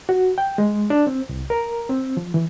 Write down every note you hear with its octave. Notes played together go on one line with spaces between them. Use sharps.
F#4
G5
G#3
D4
C4
C2
A#4
C4
F3
E3